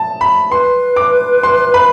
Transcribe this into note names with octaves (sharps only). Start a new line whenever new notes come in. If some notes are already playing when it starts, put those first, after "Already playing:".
Already playing: A5
B5
B4 C6
D6
C6
B5